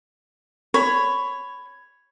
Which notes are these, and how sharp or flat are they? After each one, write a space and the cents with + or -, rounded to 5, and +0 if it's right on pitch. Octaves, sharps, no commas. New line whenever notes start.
C#5 +0 B5 +15